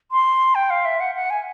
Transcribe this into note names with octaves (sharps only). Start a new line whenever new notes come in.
C6
G5
F5
E5
F#5
F#5
G#5